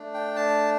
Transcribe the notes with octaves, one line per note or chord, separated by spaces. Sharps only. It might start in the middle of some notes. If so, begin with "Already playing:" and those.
Already playing: A3 D4
G5
A5